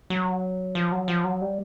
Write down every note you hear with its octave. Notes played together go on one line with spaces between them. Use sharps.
F#3
F3
F#3
F3
F#3
G3